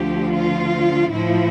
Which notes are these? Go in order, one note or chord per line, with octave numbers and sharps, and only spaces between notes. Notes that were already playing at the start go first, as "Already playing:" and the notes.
Already playing: D2 D3 F3 G4
F4
A2 F3 E4